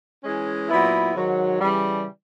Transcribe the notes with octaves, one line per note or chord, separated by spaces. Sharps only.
E3 G#3 C#4
A#2 F#3 B3 E4
G#2 D#3 F#3
C#3 E3 G3